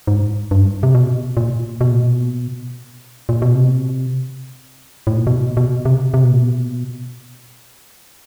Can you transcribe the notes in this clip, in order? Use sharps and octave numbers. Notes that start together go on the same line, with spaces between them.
G#2
G2
C3
B2
A#2
B2
A#2
B2
A#2
B2
C3
A2
A#2
B2
B2
C3
C3
B2
A#2
B2